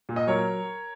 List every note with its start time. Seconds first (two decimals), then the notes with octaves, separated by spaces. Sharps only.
0.09 A#2
0.16 D#5
0.27 F#3 A#4 C#5